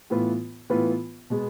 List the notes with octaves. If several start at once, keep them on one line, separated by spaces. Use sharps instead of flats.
A2 E3 B3 F4 B4
A2 E3 B3 F4 B4
B2 G#3 B3